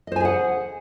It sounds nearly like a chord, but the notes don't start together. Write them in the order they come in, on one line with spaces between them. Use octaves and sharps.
D#5 C5 G#5 G#4 F#5